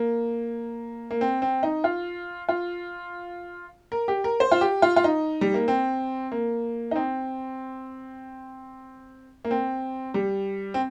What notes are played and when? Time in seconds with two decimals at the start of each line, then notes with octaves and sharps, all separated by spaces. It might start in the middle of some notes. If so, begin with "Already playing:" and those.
Already playing: A#3
1.11 A#3
1.21 C4
1.42 C4
1.63 D#4
1.84 F4
2.49 F4
3.92 A#4
4.08 G4
4.24 A#4
4.40 C5
4.51 F4
4.61 G4
4.82 F4
4.96 F4
5.04 D#4
5.41 G3
5.54 A#3
5.68 C4
6.32 A#3
6.91 D#4
6.96 C4
9.45 A#3
9.51 C4
10.14 G3
10.74 C4